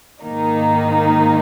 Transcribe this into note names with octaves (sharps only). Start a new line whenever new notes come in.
G#2 D#3 A#3 D#4